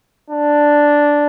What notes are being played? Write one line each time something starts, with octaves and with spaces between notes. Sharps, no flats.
D4